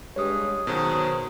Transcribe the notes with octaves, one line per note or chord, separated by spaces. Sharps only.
G2 G#3 C#5 D#6
B2 D#3 F#3 G#4 C5